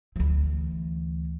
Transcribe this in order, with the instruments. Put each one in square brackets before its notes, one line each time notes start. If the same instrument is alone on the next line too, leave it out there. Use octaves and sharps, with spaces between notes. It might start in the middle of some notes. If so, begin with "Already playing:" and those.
[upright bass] D2 E3